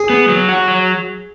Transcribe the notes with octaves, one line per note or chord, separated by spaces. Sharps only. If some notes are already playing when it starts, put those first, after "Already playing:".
Already playing: G#4
B3
F#3
F#4
F#3